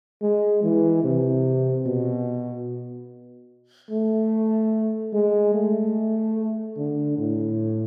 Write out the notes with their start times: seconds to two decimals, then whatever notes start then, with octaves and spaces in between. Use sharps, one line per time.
0.22 G#3
0.63 E3
1.04 C3
1.86 B2
3.90 A3
5.13 G#3
5.54 A3
6.77 D3
7.18 A2